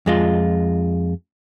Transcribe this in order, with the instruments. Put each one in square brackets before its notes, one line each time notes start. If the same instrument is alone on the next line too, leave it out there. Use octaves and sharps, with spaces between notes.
[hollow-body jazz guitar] F2 G#3 F4